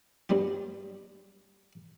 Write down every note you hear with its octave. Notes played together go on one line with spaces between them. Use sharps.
G2 F#3 G3 B3 F4